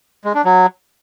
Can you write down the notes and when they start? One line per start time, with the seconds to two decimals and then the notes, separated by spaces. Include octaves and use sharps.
0.24 G#3
0.34 D4
0.45 F#3